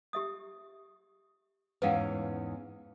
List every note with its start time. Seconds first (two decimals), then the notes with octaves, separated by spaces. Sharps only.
0.13 G4 E5 D#6
1.82 E2 G#2 C#4 B4 F5 F#5